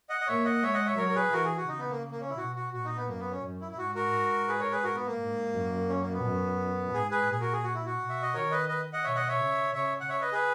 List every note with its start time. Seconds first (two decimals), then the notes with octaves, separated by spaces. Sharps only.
0.09 D#5 F#5
0.21 D#5
0.27 A#3 C#5 E5
0.45 D#5 F#5
0.63 G#3 C#5 E5
0.74 D#5 F#5
0.86 C#5 E5
0.97 F#3 A#4 C#5
1.09 A#4
1.15 G#4 B4
1.32 E3 F#4 A#4
1.45 G#4
1.57 F#4
1.68 C#3 D#4
1.79 B3
1.91 A#3
2.11 A#3
2.21 C#4
2.30 E4
2.37 B2 F#4
2.56 F#4
2.73 A#2 F#4
2.85 D#4
2.96 B3
3.08 F#2 A#3
3.20 B3
3.31 C#4
3.43 F#2
3.61 E4
3.71 E4
3.78 G#2 F#4
3.95 F#4 A#4
4.13 G#2
4.48 G#4 B4
4.60 A#4 C#5
4.72 G#4 B4
4.83 F#4 A#4
4.95 B3
5.07 A#3
5.18 G#2
5.53 F#2
5.89 C#4
6.01 A#3
6.13 B3
6.23 F#2
6.94 G#2 G#4
7.11 G#4 B4
7.29 A#2 G#4
7.40 F#4 A#4
7.53 G#4
7.64 F#4
7.74 E4
7.86 F#4
7.99 B2
8.09 E5
8.22 D#5
8.34 D#3 A#4 C#5
8.51 B4 D#5
8.69 B4 D#5
8.93 D#5 F#5
9.04 B2 C#5 E5
9.15 D#5 F#5
9.28 C#5 E5
9.39 C#3
9.74 C#3 C#5 E5
10.01 F#5
10.09 C#5 E5
10.21 B4 D#5
10.32 G#4 B4